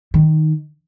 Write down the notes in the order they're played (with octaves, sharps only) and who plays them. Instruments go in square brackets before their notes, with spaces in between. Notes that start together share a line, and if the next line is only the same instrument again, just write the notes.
[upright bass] D#3